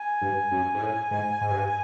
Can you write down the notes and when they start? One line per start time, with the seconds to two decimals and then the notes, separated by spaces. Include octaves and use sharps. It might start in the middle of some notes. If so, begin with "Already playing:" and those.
Already playing: G#5
0.21 G2
0.51 F#2
0.74 G#2
0.81 A2
1.11 G#2
1.41 G#2
1.51 G2